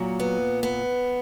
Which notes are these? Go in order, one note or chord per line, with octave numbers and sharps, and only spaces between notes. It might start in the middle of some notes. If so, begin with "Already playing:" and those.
Already playing: A#2 F#3
B3
B3